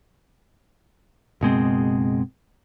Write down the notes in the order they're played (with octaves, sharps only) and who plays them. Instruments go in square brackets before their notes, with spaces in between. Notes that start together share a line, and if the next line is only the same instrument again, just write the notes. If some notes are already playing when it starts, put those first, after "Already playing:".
[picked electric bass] F#1 B2 G#3 C4